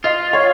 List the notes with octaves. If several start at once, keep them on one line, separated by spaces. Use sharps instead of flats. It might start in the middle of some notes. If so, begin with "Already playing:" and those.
F4 D#5
C#5